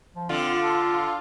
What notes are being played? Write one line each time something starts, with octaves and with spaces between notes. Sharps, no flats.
F3
D3 C4 F4
A4